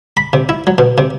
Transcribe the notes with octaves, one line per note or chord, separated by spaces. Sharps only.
B5
C3
E4
F#3
B2
C3